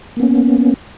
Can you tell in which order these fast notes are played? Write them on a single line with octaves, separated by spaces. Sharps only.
A#3 B3 C#4